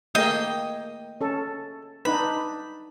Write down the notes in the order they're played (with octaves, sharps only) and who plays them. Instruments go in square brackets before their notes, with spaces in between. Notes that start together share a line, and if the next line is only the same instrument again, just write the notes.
[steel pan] A3 A#3 G#4 [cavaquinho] D#5 G5
[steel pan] C#4 A4
[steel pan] D4 D#4 B4 [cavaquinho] B5